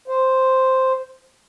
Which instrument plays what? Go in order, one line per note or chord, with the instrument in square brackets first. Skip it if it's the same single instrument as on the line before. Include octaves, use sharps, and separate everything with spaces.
[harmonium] C5